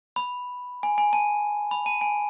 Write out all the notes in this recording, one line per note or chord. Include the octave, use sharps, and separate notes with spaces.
B5
G#5
G#5
A5
B5
A5
G#5